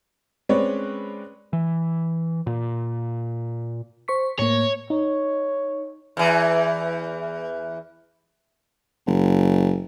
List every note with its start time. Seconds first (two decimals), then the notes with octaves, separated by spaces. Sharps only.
0.49 G#3 C4 C#4 B4 C#5 D5
1.53 E3
2.47 A#2
4.08 C5 C#6 B6
4.39 A2 A#3 C#5
4.90 D#4 C#5
6.17 E2 E3
9.07 F#1